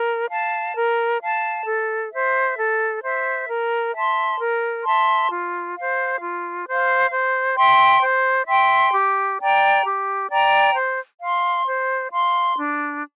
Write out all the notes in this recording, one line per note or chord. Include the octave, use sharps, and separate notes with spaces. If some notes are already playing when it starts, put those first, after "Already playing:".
Already playing: A#4
F5 A5
A#4
F5 A5
A4
C5 E5
A4
C5 E5
A#4
E5 A5 C6
A#4
E5 A5 C6
F4
C5 F5
F4
C5 F5
C5
E5 G5 C6
C5
E5 G5 C6
G4
D5 G5 A#5
G4
D5 G5 A#5
C5
F5 C6
C5
F5 C6
D4